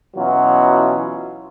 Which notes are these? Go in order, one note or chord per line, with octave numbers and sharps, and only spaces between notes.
B2 E3 F#3 C#4 E4 F4